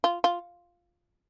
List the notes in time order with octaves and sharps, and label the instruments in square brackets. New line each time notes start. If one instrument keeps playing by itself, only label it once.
[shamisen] F4
F4